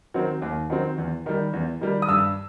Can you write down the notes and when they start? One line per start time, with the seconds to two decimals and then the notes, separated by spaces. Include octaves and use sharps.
0.14 D#3 F#3 C4
0.42 D#2
0.70 D#3 F#3 C4
0.98 E2
1.26 D#3 G3
1.53 E2
1.81 D#3 G3
2.02 D#6
2.08 G2 E6